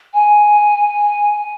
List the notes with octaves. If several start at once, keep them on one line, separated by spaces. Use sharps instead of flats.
G#5